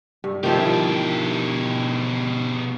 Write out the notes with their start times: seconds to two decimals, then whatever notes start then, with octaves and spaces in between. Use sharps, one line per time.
0.24 G2
0.44 B2 D#3 F3 E4 G4